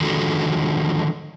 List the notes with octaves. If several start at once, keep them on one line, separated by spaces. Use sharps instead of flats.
D3 D#3 F3 G#3 F#4 A4